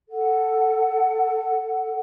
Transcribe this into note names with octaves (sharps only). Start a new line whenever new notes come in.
A4 F#5